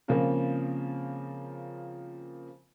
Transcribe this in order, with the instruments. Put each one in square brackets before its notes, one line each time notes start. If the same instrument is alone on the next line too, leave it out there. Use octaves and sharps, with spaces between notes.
[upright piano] C#3 F3 A#3 C4 F4 A#4